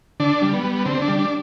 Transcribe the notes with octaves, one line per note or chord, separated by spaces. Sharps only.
D3 D4
G3
B3
G3
D3 C4
D4
G3
D4